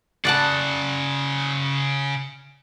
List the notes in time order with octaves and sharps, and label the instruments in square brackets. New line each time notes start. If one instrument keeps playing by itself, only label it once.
[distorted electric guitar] C#3 F#4 [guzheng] D5 F#5 A5